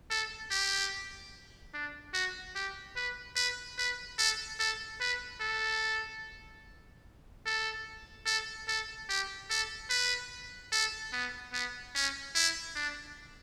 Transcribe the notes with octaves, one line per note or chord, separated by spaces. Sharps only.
A4
G4
D4
F#4
G4
B4
B4
B4
A4
A4
B4
A4
A4
A4
A4
G4
A4
B4
A4
B3
B3
C#4
E4
D4